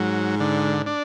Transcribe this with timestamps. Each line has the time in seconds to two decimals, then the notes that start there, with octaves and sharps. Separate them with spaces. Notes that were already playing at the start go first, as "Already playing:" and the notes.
Already playing: G#2 F#3
0.40 D3
0.86 D4